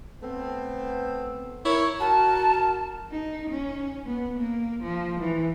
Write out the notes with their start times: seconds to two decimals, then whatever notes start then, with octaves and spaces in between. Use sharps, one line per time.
0.22 A3 B3 C4
1.64 E4 A#4 C#5
2.00 F#4 A#4 A5
3.12 D#4
3.50 C#4
4.07 B3
4.40 A#3
4.83 F3
5.20 E3